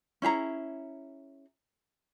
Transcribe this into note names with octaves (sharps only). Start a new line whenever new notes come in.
C#4 E4 G#4 A#5